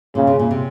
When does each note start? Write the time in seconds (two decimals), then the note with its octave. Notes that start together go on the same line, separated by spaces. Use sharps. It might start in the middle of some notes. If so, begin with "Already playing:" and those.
0.15 A#2 C#3
0.27 C3
0.39 A#2
0.51 C3